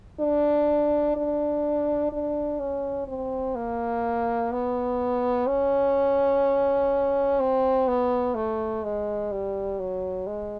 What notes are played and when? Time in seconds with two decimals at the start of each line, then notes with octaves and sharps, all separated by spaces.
0.20 D4
1.16 D4
2.12 D4
2.59 C#4
3.08 C4
3.56 A#3
4.52 B3
5.47 C#4
7.40 C4
7.88 B3
8.35 A3
8.84 G#3
9.32 G3
9.79 F#3
10.27 G#3